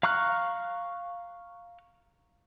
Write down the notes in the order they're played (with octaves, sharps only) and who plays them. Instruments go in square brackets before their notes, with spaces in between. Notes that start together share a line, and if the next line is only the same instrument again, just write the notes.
[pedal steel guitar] F5 A#5 C#6 F6 F#6